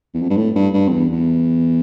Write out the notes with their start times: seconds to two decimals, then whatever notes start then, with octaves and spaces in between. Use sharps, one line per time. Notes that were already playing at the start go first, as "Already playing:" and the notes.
0.15 E2
0.22 F2
0.30 G2
0.37 A2
0.56 G2
0.74 G2
0.88 F2
0.93 E2
1.12 E2